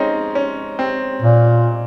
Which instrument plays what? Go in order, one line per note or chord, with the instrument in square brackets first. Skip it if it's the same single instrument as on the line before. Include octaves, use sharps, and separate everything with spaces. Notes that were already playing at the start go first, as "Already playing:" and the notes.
Already playing: [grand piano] G#3 C4 C#4 D#4
C#4
C4
[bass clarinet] A#2